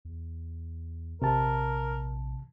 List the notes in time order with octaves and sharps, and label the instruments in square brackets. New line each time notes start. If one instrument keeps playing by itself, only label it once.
[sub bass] E2
[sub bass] A#1 [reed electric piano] C3 A5 [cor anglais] A#4